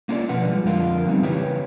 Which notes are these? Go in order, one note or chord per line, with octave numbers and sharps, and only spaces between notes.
A#3 C#4 F4 A4 D5
B2 D3 F3 B4 F#5
F3 G3 G#3
F2 D3 F4 A#4
E3 G3 B3 C4 D#4
C#3 E3 G4 B4 C#5